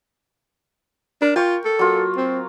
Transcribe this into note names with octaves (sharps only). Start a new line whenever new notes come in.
D4 A#4
F4 G5 C#6
A4
F#3 A#3 F4
C4